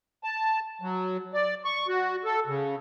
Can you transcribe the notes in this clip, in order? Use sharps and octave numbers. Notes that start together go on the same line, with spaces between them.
A5
F#3
D5
C#6
F#4
A4
C#3